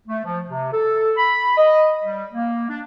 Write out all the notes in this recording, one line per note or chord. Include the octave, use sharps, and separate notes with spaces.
A3
F3
C3
A4
B5
D#5
G3
A#3
D4